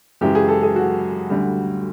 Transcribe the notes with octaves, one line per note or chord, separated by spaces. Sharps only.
F#2 C#3 E3 G#3 G4
G#4
A4
G#4
F#4
D2 D3 G3